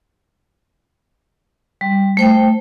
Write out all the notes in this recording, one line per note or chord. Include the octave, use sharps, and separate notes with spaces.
G3
A3 C5 G5